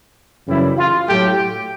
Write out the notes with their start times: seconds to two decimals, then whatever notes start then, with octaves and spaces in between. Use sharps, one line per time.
0.46 F#2 C#3 E3 G3 E4
0.77 F4
1.07 A2 F#3 A3 G4